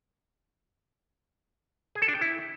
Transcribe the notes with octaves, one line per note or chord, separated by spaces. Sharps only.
G#4
A4
D4
G5
E4